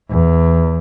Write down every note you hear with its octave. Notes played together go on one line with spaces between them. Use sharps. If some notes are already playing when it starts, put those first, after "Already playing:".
E2